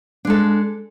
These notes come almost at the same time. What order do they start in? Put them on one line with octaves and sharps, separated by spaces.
D4 G#3 A4